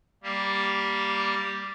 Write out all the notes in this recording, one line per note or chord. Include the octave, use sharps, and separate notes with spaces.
G3 A#3 G4